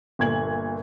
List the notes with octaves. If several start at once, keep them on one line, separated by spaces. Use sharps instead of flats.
G1 A#2 G#6 F#7